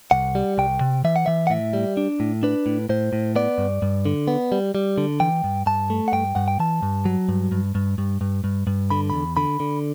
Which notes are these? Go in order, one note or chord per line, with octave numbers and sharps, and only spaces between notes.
C2 F#5
G3
C2 G5
C3
E3 E5
F#5
E3 E5
F#5
A2 E5
G3
D4
A2
D4 B4
A2
A2 C5
A2
B3 D5
G2
G2
D3
B3
G3
G3
D3
E3 G5
G2
G2 A5
A3
F#5
G2 G5
G2 F#5
G5
E3 A5
G2
F#3
G2
G2
G2
G2
G2
G2
G2
D3 B5
E2 B5
D3 B5
D3